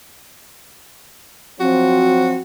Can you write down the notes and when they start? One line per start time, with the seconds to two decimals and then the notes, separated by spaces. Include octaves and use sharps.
1.60 F3 F#3 C4 F#4